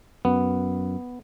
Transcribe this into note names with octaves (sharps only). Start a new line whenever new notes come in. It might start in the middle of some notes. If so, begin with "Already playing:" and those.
F#2 B3